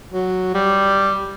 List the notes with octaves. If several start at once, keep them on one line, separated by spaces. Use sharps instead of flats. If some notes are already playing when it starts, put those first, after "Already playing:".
F#3
G3